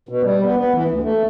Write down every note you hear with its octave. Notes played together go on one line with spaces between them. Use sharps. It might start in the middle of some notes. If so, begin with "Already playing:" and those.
B2
G3
B3
B3
E3
D2
A3